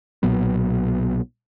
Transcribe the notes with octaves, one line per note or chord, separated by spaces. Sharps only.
B1 A#2 F#3 B3